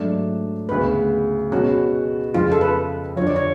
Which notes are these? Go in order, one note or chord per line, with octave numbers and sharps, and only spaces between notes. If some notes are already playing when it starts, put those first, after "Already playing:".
Already playing: G#2 F#3 A3 D4
D2 C#3 G#3 B3 B4
B2 G#3 B3 C#4 F#4
F2 C#3 F3 G#3 F4
A4
B4
F2 D3 F3 C#5
D5
C#5